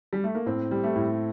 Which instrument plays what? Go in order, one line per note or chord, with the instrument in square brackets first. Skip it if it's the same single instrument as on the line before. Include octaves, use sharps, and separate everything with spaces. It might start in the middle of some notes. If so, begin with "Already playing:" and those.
[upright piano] G3
A3
A#3
[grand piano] A2 [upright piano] C4
[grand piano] G3
[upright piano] A3
[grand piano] A2